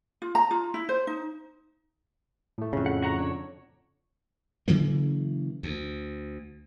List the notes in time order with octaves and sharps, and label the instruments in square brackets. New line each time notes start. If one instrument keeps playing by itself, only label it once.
[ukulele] F4
A#5
F4
E4
C5
D#4
[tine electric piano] A2 A3
[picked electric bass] F2 C#3
[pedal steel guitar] F#5
F#4 F#5 A#5
D4 C#5
[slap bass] C#3 E3 F#3 A#3
D2